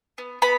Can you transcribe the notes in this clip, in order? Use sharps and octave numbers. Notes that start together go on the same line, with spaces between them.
B3
B3 B5